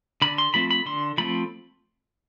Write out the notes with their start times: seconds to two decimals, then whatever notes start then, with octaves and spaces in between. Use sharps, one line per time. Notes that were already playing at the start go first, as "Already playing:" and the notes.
0.22 D3 B5
0.38 C6
0.54 F3 A3 C4 B5
0.71 B5
0.86 D3 C6
1.18 F3 A3 C4 B5